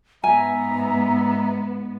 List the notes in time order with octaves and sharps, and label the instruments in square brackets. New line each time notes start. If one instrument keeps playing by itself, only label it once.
[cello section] G#2 B3 [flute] E5 [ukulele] G#5 [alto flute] A#5